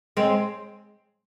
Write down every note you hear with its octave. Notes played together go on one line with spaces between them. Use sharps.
G#3 C4